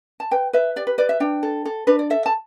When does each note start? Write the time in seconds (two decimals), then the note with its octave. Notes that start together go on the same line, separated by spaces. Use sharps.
0.20 A5
0.31 B4 G5
0.53 B4 E5
0.76 G4 D5
0.87 B4
0.98 B4 D5
1.09 E5
1.20 D4 G5
1.43 A4
1.65 A4
1.87 D4 B4
1.99 D5
2.10 A4 E5
2.26 A5